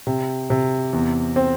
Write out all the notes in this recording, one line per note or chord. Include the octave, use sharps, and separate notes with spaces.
C3
C3
E2
C4